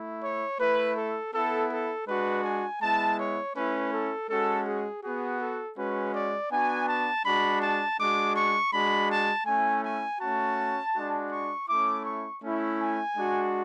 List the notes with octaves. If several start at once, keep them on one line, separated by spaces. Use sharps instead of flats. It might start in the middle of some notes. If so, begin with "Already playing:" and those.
Already playing: A3 E4
C#5
A3 E4 B4
A4
B3 E4 A4
A4
G#3 D4 F#4 B4
G#5
G#3 B3 E4 A5
C#5
A3 C#4 E4 B4
A4
G#3 C#4 F#4 A4
G#4
B3 F#4 G#4
A4
G#3 C#4 F#4 B4
D5
B3 D4 F#4 G#5
A5
G#3 D4 F#4 B5
A5
G#3 D4 F#4 D6
C#6
G#3 D4 F#4 B5
A5
A3 C#4 E4 G#5
G#5
A3 C#4 F#4 A5
G#3 D4 F#4
C#6
A3 C#4 E4 D6
C#6
A3 C#4 E4
G#5
G#3 D4 F#4